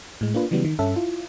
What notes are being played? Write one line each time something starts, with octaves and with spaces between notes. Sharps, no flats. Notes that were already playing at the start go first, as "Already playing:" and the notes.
A2 G#3
A#3 D4 F4 B4
C#3 E3 F#3 G3 B3
D#3
G2 C#4 A4 E5
E4 F4